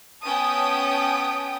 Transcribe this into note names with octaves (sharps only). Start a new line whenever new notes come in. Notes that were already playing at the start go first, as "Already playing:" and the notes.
B3 C#4 G5 A5 D#6